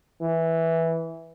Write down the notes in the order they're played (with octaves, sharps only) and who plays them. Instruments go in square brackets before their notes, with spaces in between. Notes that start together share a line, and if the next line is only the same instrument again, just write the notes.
[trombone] E3